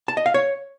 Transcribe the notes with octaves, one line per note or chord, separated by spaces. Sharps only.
A5
D#5
F5
C#5